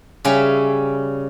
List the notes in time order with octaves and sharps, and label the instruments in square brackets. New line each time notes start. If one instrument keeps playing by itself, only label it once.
[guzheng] C#3 G3 C#4 E5